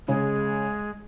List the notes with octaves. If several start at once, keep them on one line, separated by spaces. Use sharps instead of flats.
C#3 G#3